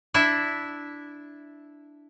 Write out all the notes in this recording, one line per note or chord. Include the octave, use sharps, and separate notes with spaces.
D4 E4 E5